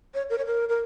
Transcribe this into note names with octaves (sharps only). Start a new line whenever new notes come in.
C#5
A#4
C#5
A#4
A#4